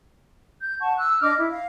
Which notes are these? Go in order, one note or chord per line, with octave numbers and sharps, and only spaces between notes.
G6
F#5 A5 C#6
E6 F#6
D4 D#5 D6 F6
E4
F5